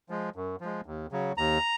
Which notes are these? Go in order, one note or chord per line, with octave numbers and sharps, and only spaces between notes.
F3 G#3
F#2
F3 G#3
D#2
C#3 F#3
D#2 A#5